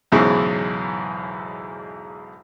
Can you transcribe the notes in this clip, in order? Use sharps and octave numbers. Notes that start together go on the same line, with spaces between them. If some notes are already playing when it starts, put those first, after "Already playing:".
B1 E2 G#2 C#3 E3 G#3